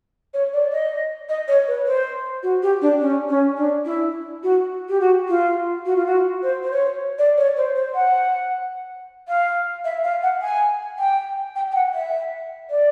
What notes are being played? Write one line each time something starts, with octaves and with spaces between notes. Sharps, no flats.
C#5
D5
D#5
D#5
C#5
B4
C5
F#4
G4
D4
C#4
C#4
D4
E4
F#4
G4
F#4
F4
F#4
F4
F#4
C5
C5
C#5
D5
C#5
C5
C5
F#5
F5
E5
F5
F#5
G#5
G5
G5
G5
F#5
E5
D5